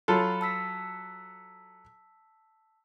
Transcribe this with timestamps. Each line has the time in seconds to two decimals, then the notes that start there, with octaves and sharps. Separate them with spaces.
0.08 F#3 F4 A4 B5 C6
0.41 A5 E6 B6